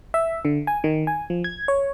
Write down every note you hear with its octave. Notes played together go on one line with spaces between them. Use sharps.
E5
D3
G#5
D#3
G#5
F3
G#6
C#5